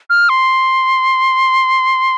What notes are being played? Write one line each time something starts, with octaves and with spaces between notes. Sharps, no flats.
F6
C6